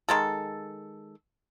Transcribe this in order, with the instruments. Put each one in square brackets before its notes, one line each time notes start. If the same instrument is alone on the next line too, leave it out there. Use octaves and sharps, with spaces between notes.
[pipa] D#3 G#3 A4